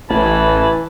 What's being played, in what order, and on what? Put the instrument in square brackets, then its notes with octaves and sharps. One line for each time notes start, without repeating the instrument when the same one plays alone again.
[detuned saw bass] A1 [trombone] E3 [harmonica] G#5 A5 B5